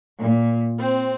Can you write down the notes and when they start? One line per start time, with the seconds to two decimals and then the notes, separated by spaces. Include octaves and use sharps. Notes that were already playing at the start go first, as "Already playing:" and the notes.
0.19 A#2
0.78 C4